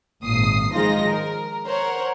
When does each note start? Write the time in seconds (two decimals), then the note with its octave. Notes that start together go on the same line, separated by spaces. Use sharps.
0.24 G#1 A#2 D#6 C7
0.74 D#3 F3 G#3 D#4 F4 A#6
1.09 A#4
1.67 A#4 C5 C#5 F#5